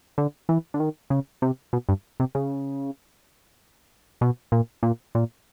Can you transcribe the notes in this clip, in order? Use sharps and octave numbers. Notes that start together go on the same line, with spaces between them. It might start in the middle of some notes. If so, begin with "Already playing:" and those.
D3
E3
D3
D#3
C#3
C3
B2
G2
C3
C#3
B2
A#2
A#2
A#2